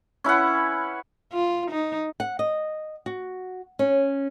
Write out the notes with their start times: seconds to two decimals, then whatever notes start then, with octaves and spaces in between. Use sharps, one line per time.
0.24 C#4 E4 B4 F#5
1.33 F4
1.71 D#4
2.20 F#5
2.39 D#5
3.06 F#4
3.79 C#4